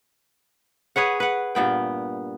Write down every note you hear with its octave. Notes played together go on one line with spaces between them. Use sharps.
G#4 B4 C#5 F#5
B4 F#5
G2 A#2 B3 G5